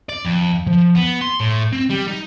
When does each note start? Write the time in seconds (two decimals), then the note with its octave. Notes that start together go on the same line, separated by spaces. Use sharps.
0.09 D5
0.25 F2
0.67 F3
0.95 B3
1.22 C6
1.40 A2
1.72 C4
1.90 G3
2.07 D#4